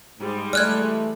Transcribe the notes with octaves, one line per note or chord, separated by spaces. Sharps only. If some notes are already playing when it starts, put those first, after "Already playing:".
G#2 G3 G#3
E3 A3 D5 F6 F#6 G#6